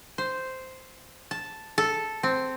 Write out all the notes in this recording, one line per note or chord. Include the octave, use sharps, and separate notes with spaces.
C5
A5
A4
C4